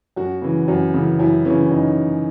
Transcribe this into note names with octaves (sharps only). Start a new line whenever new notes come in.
F#2 F#4
C#3 E3
F#2
C#3 E3
F#2 E4
C#3 E3 C#4
F#2 D#4